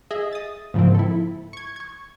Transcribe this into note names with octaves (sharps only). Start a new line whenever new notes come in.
G#4 D#5 E5
D#6 A6
G#2 C#3 F3 A#3 C4
E4 A4
C#6 G#6
C#6 G#6